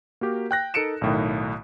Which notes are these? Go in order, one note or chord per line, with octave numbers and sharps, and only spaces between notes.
A#3 F#4 G4 A#4
G5 F#6 A#6
D#4 A4 A#4 C#7 D7 E7
B1 A2 D#3